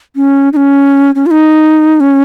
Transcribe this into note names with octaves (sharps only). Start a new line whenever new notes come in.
C#4
D#4
C#4
C#4
F4
D#4
C#4